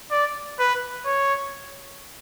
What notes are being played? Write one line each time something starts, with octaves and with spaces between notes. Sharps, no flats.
D5
B4
C#5